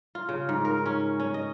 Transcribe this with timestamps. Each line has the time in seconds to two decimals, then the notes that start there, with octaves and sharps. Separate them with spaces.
0.15 F4
0.29 C#3
0.49 G#2
0.65 A#4
0.86 C#4
1.20 C#4
1.34 D#5